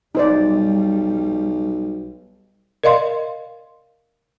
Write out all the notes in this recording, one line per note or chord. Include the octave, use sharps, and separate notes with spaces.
B1 G3 D#4 C5 D5
A#4 D5 D#5 F5 C6